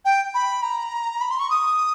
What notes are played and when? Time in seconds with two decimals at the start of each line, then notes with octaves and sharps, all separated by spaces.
0.05 G5
0.34 B5
0.63 A#5
1.21 B5
1.31 C6
1.39 C#6
1.50 D#6